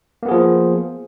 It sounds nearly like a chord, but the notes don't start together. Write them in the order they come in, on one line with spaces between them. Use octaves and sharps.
A#3 B3 G#4 F3